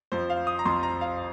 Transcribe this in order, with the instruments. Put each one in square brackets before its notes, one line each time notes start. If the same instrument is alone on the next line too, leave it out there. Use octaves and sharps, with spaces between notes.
[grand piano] F2 F3 C5
F5
D#6
A#5
F2 F3 C6
A#5
F5